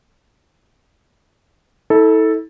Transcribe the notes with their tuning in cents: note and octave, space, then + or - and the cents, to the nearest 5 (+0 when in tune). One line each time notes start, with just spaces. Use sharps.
E4 -40 A4 +0